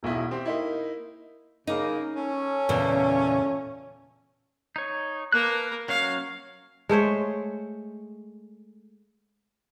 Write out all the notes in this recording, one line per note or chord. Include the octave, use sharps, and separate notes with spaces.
E1 B1 B2 E4
C4 G4
A#3 D#4 E4
C#3 A#3 D#4
C#4 A4
E2 A#2 C#3
D#4 C#5
A#3 A#4 B4 A5 F#6
F#3 C#4 C#5 F5
G#3 A3 C5 C#5